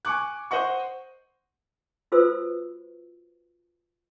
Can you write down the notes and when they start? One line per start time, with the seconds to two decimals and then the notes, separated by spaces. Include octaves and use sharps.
0.05 G#5 C#6 D6 F#6
0.51 C5 D#5 F#5 C#6
2.12 F4 F#4 A4 B4 C5 E6